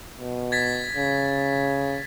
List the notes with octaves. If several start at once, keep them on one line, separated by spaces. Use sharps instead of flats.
B2
G#6 A6 B6
C#3